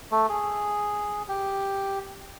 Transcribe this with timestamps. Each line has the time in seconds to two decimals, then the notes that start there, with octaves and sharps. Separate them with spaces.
0.11 A3
0.29 G#4
1.29 G4